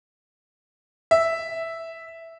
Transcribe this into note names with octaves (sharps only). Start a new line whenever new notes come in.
E5